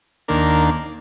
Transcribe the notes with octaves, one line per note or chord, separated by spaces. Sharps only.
D#2 D#3 A#3 D4 A#4